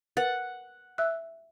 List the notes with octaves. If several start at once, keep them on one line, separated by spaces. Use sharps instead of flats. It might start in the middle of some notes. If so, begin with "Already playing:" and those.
A#4 B4 F#5 A6
E5 E6 F#6